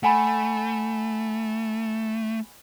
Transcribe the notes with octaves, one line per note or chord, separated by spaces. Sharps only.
A3 F#5 G#5 B5